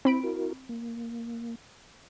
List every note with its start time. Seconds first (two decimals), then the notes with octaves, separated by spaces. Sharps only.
0.05 C4 E4 C5 B5 D7
0.23 E4 F#4 A#4
0.69 A#3